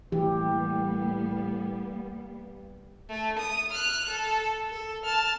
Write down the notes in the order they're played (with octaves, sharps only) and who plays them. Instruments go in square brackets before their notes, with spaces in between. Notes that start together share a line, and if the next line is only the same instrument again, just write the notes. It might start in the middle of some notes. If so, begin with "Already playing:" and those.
[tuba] A2 [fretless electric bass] E3 [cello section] G3 A#3 B3 [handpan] G4
[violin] A3
D#6
F6 F#6
A4
A4
A5 F6